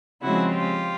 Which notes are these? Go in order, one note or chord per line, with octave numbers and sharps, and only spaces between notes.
C#3 F3 G#3 C4 E4 F#4
F4 G4